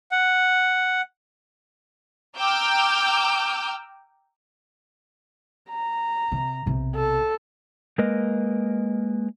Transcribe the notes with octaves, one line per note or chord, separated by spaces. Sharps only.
F#5
G5 A#5 D6 E6 F6 G6
A#5
C3
B1 C3
A4
G#3 A#3 A#4 B4 D#5